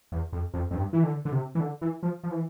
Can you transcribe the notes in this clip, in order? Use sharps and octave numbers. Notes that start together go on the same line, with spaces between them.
E2
F2
F2
F2
G2
E3
D3
D3
C3
E3
D3
E3
F3
F3
E3